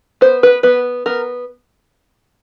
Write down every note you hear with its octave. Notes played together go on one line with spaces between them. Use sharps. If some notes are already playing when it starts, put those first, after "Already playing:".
B3 C5
B4
B3 B4
B3 A#4